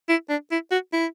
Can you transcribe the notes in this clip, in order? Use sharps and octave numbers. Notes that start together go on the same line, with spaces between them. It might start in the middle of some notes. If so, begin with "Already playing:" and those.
E4
D4
E4
F#4
E4